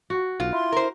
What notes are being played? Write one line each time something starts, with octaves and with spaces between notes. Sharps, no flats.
F#4
B1 F4
E4 C6
A#4 C5